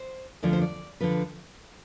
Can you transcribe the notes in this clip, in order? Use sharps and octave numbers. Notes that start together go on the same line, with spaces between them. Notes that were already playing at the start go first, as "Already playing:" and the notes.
Already playing: C5
D2 D3 F3 D5
C5
D5
D3 F3 B4